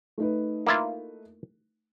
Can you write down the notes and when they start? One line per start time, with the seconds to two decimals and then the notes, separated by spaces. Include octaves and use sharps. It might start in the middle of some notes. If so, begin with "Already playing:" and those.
0.18 A3 D#4 B4
0.67 A#3 E4 F4